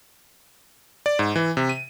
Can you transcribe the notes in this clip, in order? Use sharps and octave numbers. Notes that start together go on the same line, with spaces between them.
D5
G#2
E3
C3
D#7